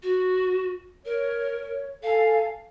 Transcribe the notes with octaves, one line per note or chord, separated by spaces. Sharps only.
F#4
A#4 C#5
A4 F5 G#5